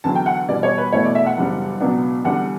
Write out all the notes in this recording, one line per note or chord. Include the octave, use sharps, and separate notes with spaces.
E2 D3 F#3 A5
G5
F#5
E2 B2 G3 D5
C#5
B4
E2 B2 A3 E4 C#5
D5
E5
F#5
F#1 E2 C#3 G3 D4
C#2 B2 F#3 B3 D4
E2 D3 G3 D4 F#5